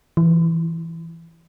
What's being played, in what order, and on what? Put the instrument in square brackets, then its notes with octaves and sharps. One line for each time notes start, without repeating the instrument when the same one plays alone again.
[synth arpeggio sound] E3